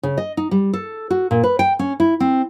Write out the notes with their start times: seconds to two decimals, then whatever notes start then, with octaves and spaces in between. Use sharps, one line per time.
0.03 C#3
0.18 D#5
0.37 D#4
0.51 G3
0.74 A4
1.10 F#4
1.31 A#2
1.44 B4
1.59 G5
1.79 C#4
2.00 E4
2.20 C4